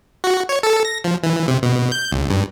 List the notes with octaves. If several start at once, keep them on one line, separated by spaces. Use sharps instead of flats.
F#4
C#5
A4
A#6
F3
E3
C3
B2
G6
C#2
G2